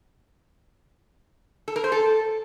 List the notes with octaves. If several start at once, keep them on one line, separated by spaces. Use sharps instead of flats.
A4
A#4
C5
A4